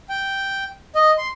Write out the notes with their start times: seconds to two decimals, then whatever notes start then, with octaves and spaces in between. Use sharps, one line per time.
0.09 G5
0.95 D#5
1.18 C6